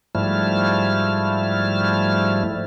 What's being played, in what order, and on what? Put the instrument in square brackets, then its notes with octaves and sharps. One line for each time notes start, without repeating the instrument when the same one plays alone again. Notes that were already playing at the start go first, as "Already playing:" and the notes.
[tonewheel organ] G#2 F3 G3 A3 E4 F6